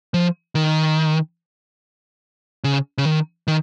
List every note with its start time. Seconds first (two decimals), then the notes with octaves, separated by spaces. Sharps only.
0.14 F3
0.55 D#3
2.64 C#3
2.98 C#3
3.06 D#3
3.48 D#3